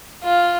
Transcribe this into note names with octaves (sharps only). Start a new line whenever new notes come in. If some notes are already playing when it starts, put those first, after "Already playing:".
F4